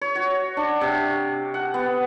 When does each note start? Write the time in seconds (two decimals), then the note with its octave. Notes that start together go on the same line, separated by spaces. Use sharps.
0.01 C#5
0.15 F#4
0.57 D4
0.81 C3
1.54 F#5
1.74 B3